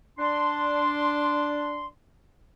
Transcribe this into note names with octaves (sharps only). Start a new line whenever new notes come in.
D4 C6